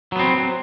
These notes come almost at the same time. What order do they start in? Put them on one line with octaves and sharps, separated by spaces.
F#3 B3 C4